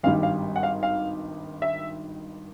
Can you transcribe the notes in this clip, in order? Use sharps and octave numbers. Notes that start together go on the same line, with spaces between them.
G#1 G2 D#3 G3 F5
F5
F#5
F5
F5
E5